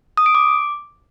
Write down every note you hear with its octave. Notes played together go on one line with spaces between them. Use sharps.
D#6
D7
D6